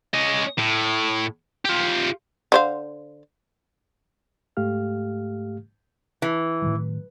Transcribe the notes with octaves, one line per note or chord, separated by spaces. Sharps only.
C#4 D#5
A2
F4 G4
D3 C5 F5
G#2 A3 G4 F5 F6
E3
A2 D#3 F#3